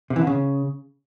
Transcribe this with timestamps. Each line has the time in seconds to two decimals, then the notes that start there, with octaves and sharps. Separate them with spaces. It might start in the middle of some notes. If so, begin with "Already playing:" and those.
0.10 C3
0.16 E3
0.21 D3
0.27 C#3